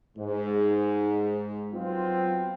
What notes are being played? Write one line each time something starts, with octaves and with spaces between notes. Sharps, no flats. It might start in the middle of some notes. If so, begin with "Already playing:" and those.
G#2
F#3 B3 C4 F4